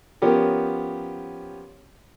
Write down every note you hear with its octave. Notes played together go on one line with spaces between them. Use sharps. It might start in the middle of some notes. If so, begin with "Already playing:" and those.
F3 B3 C#4 G4 A#4